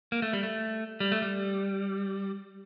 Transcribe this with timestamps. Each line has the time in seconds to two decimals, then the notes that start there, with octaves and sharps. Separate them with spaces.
0.12 A#3
0.22 A3
0.33 G3
0.43 A3
1.00 G3
1.12 A3
1.22 G3